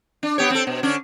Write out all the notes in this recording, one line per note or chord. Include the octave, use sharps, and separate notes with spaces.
D4
B3 G4 C#5
C4 A4
B2
D3 C#4 D4